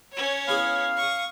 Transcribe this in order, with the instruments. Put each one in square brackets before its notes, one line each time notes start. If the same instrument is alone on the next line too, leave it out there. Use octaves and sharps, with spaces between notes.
[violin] C#4 C#5
[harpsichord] B3 E4 G#4 [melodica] F5
[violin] C#6 D#6